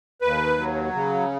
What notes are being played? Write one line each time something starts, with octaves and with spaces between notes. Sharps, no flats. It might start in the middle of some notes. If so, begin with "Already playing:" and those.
D#2 B4
F#3
C#3